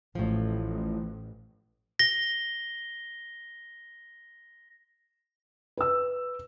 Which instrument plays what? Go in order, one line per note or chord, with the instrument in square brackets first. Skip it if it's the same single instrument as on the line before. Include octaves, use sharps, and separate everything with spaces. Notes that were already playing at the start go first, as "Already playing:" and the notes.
[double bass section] A1 [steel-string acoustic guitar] A2 F3
[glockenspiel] A#6 G7
[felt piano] B4 E6